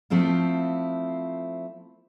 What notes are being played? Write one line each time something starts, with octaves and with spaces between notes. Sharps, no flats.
F3 A3 C4 E4 F4